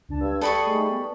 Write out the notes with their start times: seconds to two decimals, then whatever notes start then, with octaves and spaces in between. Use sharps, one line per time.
0.08 C#2 D4 A5
0.21 G2 E6 G#6
0.41 G3 A4 B5 C#6 D#6 C7 C#7
0.66 A3 D#4 G#4
0.89 B3